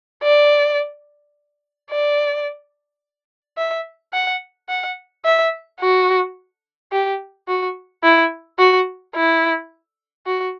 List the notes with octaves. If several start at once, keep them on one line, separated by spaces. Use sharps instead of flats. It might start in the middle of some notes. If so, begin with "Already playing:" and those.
D5
D5
E5
F#5
F#5
E5
F#4
G4
F#4
E4
F#4
E4
F#4